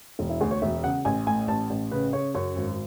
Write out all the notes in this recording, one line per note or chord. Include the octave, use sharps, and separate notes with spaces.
E1
E4
D2 G#4
C#5
E1 E5
C#3 F#5
A1 G#5
A2 G#5
A1 A5
A1
C#3 B4
C#3 C#5
F#2 C#5
G#1